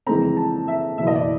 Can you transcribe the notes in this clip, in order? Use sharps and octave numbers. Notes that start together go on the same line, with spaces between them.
F2 C#3 E3 G#3 C4 A#5
A5
E5
F#1 E2 B2 E5
D#5
D5